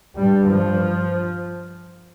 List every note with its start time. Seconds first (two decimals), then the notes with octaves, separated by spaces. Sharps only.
0.15 G2 G3
0.50 F3